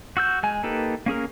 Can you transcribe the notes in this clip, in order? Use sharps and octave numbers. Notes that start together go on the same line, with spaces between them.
F#4 E6 G6
G#3 G#5
A#3 D#4 G4 A4 B4
A#3 C#4 G#4 A#4